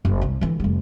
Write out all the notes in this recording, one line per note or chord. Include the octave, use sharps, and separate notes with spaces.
F#1
C2
D3 E3
F1 G3